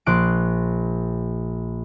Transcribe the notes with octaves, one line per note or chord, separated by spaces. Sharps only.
A#1 C6 D6 F#6 D7